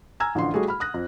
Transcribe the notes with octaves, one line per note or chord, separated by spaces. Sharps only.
G#5 A#5 E6 F6 G#6
A1 D3 F3 C6
G3 A3 F#4 G#4
B5 F6
D#6 F#6 A#6
F2